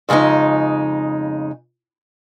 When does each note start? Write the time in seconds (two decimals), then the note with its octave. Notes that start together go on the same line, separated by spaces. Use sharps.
0.09 F2 C#3 G#3 B3 D#4